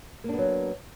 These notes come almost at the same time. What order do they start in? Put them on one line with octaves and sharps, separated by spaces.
A#3 D4 B3 F#3